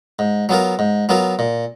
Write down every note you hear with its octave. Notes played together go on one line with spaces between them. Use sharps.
G#2
F#3 B3 F4 A#4
G#2
F#3 B3 F4 A#4
A#2